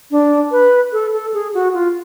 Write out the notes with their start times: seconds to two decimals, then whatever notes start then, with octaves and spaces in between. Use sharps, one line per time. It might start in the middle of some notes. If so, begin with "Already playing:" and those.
0.11 D4
0.51 B4
0.93 A4
1.13 A4
1.34 G#4
1.54 F#4
1.74 F4